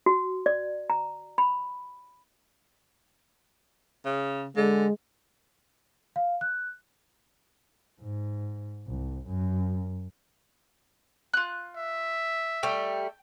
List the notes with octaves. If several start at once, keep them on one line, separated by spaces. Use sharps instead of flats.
F#4
D5
A#5
B5
C#3
D3 G#3
F5
F#6
G#2
C2
F#2
F4 F#6
E5
G3 A3 G4 G5